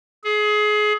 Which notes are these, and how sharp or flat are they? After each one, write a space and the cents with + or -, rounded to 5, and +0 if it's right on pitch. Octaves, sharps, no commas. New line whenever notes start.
G#4 +25